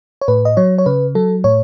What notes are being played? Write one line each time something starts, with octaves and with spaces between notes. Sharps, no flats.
C#5
A2 B4
D#5
F#3 C#5
C#5
C#3 B4
F#3 A4
A2 C#5